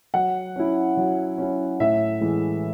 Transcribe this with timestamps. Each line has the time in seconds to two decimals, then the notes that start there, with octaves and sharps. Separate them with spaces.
0.14 F#3 F#5
0.56 C#4 E4
0.97 F#3
1.38 C#4 E4
1.80 A2 E5
2.21 E3 G#3